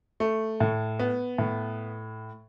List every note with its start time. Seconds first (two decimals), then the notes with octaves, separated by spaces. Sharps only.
0.20 A3
0.60 A2
0.99 B3
1.38 A2